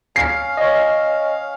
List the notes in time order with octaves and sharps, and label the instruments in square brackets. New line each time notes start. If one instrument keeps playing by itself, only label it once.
[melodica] C#4 F5 [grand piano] C7
[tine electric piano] C#5 D#5